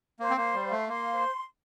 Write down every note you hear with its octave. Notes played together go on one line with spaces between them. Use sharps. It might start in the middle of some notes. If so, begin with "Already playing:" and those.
A#3 C5
C4
A#3
C6
G3
F5
A3
A#3 C6
C5